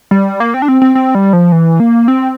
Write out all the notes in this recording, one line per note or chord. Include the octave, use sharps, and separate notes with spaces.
G3
A#3
C4
D4
C4
C4
C4
G3
F3
E3
A#3
C4